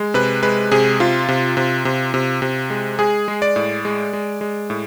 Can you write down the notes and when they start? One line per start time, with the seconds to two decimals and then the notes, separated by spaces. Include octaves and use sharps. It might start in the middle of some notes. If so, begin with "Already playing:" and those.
Already playing: G#3
0.14 C3 B4
0.42 G#3 B4
0.71 C3 G#4
1.00 C3 F4
1.28 C3
1.57 C3
1.85 C3
2.14 C3
2.42 C3
2.70 G#3
2.99 G#3 G#4
3.28 G#3
3.42 D5
3.56 A2
3.85 G#3
4.13 G#3
4.41 G#3
4.70 A2